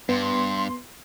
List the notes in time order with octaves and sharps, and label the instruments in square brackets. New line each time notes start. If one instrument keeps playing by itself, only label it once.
[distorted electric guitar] G2 [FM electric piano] B3 [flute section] C6